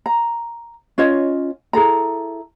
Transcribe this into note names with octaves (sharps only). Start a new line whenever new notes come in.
A#5
C#4 F4 C#5 D#5
E4 G#4 A4 A#5